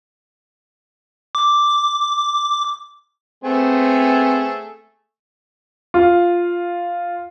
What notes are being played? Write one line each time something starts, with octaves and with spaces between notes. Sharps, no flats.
D6
A3 B3 C4 G#4
F4